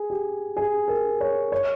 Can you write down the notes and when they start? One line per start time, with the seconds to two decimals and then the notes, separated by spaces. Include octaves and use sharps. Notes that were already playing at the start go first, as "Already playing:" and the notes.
Already playing: G#4
0.10 G4
0.57 G#4
0.88 A#4
1.21 C#5
1.52 C#5